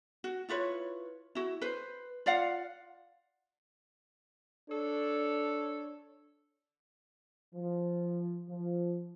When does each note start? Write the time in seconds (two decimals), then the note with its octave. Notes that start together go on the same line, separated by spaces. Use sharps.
0.24 F#4
0.49 E4 F4 B4 C#5
1.35 E4 F#4
1.62 B4 C5
2.26 F4 D5 F5 F#5
4.70 D4 A4 C#5
7.54 F3
8.48 F3